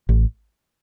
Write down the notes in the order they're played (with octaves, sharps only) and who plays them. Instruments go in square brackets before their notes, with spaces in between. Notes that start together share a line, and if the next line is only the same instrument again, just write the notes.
[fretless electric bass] A1